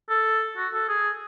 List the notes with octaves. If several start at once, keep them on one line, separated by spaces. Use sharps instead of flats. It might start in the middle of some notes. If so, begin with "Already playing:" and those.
A4
F#4
A4
G#4